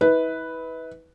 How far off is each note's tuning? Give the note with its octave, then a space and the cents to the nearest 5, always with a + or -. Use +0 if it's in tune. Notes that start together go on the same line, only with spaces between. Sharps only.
E4 -40 B4 +0